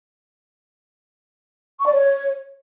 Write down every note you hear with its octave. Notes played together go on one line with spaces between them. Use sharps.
C#6
D5
C#5